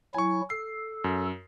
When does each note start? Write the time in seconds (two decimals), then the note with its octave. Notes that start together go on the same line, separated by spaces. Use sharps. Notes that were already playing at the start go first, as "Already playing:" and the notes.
0.14 F#3 E4 G#5 C#6
0.50 A4 C7
1.04 F#2